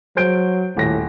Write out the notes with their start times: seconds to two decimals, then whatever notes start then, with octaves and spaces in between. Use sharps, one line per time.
0.17 F#3 C5 G6 D7
0.77 D#1 A2 A#6